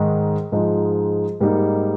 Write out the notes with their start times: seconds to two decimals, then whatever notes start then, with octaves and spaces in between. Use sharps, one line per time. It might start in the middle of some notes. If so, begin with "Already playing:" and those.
Already playing: G#2 D#3 G#3
0.52 G#2 F3 G#3 D#4
1.41 G#2 G3 A#3 D#4